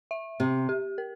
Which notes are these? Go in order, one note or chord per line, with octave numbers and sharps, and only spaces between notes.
E5
C3 G4
G4
A#4